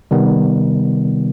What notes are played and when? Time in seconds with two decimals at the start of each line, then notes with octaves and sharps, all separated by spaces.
0.11 C3 D#3 G3 B3